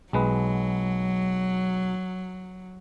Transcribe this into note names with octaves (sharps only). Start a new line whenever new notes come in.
B1 F#3 G#3 B4